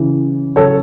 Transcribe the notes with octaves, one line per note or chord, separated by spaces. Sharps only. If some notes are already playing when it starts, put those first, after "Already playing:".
Already playing: C#3 E3
C#3 F#3 A4 C#5